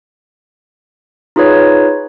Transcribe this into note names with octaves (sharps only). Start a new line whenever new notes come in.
D#4 F4 G#4 B4 C#5